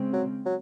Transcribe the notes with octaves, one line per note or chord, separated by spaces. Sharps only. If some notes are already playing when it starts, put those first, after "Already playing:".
Already playing: C#3 G#3 C4
F#3
F#3